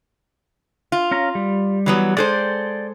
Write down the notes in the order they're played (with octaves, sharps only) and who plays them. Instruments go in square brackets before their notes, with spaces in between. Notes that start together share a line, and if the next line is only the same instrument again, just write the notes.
[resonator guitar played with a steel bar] F4
[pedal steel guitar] C#4 F5 A#5
G3
[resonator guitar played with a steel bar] E3 F#3 B3
[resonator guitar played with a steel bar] G#3 A4 C5 [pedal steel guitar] D5 G5